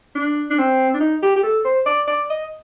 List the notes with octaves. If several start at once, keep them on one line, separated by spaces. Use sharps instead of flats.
D4
D4
C4
D4
D#4
G4
G4
A4
C5
D5
D5
D#5